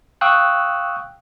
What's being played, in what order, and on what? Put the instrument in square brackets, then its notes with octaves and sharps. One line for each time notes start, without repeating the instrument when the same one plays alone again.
[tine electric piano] F5 G5 C#6 D#6 E6 F#6